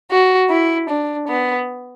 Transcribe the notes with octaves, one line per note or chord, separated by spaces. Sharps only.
F#4
E4
D4
B3